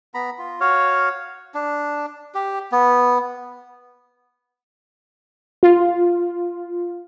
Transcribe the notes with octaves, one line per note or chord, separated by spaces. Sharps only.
B3 A#5 B5
F4
F#4 C#5 F5
D4
G4
B3
F4